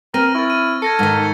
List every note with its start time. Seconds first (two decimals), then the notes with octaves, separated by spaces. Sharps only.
0.14 C4 A#4 F6 A#6 D#7
0.35 E4 C#6 A6
0.50 D#7
0.82 A4 G#6 A#6 C#7
0.99 G#2 D#3